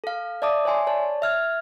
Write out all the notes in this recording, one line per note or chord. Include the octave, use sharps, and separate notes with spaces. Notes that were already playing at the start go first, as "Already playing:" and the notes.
A4 F5
D5 E5 A5 D6 D#6
C#5 E5 G#5 C6
C#5 D5 A5
E5 F6 G#6